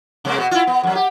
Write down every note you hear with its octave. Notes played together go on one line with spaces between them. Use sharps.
C3 G#3 A#3
B2
E4 F4
B3
F#2 F#3
G4